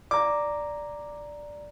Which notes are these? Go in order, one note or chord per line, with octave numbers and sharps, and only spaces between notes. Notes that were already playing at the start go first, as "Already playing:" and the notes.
D5 A#5 D6